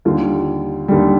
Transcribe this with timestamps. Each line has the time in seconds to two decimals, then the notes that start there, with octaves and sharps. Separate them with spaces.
0.05 D#2 D3 G3 F4
0.88 D#2 D3 G3